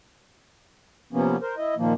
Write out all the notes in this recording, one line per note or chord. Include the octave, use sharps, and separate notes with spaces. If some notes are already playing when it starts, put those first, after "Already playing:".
C3 F3 A#3 B3 C#4
A#4 C5
E4 D#5
A#2 D#3 F3 A#3